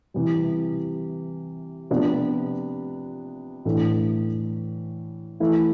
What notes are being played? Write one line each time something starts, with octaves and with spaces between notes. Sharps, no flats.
C3 E3 G3
C3 F3 B3 D4
A2 E3 A3 D4
E3 A3 E4